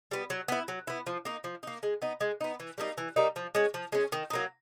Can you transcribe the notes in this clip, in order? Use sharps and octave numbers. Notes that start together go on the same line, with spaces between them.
G3 B3
F#3
B3 E4
F#3
B3 E4
F3
A#3 D#4
F3
A#3 D#4
G#3
B3 D#4
G#3
B3 D#4
E3
G3 A#3 D#4
E3
G3 A#3 D#4
F3
G#3 C#4
F3
G#3 C#4
D#3
F#3 A#3 D#4